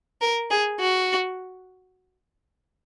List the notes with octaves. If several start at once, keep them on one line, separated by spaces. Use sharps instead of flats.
A#4
G#4
F#4